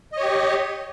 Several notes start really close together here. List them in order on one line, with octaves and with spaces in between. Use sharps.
D#5 C#5 G4